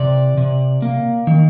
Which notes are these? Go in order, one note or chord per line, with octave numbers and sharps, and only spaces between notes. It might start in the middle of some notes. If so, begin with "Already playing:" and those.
Already playing: C3 D5
C3
A#3
D#3